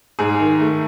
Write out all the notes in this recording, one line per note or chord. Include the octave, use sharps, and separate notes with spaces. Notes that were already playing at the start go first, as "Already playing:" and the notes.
G#2 G#4
D#3
A3